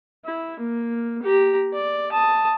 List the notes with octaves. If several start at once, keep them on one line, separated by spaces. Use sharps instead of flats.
E4
A#3
G4 A#5
D5
A5 D#6